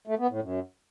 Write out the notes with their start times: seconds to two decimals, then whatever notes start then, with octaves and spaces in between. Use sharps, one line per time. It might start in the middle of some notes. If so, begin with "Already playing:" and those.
0.07 A3
0.19 B3
0.31 A2
0.42 F#2